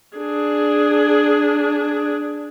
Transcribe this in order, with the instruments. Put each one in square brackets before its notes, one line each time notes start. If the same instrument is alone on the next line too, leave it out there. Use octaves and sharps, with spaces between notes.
[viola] D4 G#4